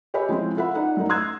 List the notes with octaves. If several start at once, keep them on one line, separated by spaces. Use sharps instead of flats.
G4 C#5 D#5 E5 G#5 B5
F3 G#3 C4 E4
F4 A4 E5 F#5 B5
D#4 D5 F#5
F#2 A3 D#4
A#5 C6 D#6 E6 F#6 G#6